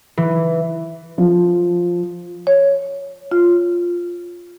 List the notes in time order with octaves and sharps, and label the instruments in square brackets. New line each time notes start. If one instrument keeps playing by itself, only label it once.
[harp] E3
[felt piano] F3
[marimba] C#5
F4